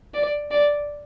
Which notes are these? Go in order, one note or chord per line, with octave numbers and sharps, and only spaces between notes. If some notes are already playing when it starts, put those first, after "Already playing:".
D5
D5